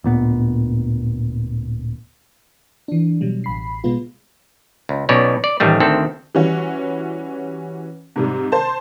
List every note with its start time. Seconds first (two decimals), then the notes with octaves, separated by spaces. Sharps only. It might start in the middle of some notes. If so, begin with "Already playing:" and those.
0.04 D1 A#2 B3
2.88 E3 D4
3.21 B2 F#3 G3
3.44 A1 B5 C7
3.84 B2 G#3 B3 F4
4.89 C#2
5.09 B1 B2 C#4 C#5 D5
5.44 D5
5.60 A1 D#3 G3 A3
5.80 D2 D#3 C4 A4
6.35 E3 G3 C#4 F#4
8.16 G#2 C3 G3
8.52 C5 A5